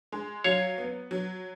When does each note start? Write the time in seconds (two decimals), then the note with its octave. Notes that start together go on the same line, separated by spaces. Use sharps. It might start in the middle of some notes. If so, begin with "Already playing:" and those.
0.12 G#3
0.44 F#3 C#5 F5
0.78 B3
1.11 F#3